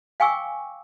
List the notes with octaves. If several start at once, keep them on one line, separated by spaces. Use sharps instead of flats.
F5 G5 G#5 C#6 D6 E6